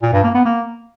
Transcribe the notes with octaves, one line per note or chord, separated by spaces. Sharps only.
A#2
G2
A#3
B3
A#3